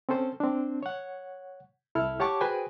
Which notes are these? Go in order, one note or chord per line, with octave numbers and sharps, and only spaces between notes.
C4 C#4 A4 C5
C4 D4
C#5 F#5
C2 E4 A4 F6
G4 C#5 F#5 A5 C#6 D6
F#4 G#4 B4 C5 G5 G#5